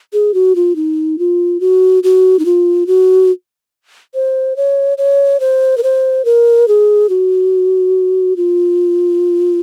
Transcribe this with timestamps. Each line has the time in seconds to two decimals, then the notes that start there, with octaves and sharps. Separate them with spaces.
0.13 G#4
0.34 F#4
0.56 F4
0.76 D#4
1.19 F4
1.60 F#4
2.03 F#4
2.39 D#4
2.45 F4
2.87 F#4
4.15 C5
4.57 C#5
4.98 C#5
5.40 C5
5.78 A#4
5.83 C5
6.25 A#4
6.68 G#4
7.09 F#4
8.37 F4